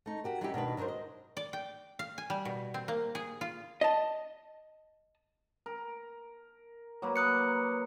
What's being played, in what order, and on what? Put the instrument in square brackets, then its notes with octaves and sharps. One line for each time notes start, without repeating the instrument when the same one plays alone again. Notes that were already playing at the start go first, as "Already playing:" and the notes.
[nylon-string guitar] A3 D#4
F#4 G4 A#4
F#3 G3 C#4 D#4 E4 G4
B2 D#3 D4 B4
F#3 D4 D#4 A#4 C5
D#5
[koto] D5
G5
F5
G#5
G3
B2
C4
A#3
G#4
F4
[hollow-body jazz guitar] D#5 A5
[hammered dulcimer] A#4
F#3 A#3 B4
[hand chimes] D#6 F#6 C#7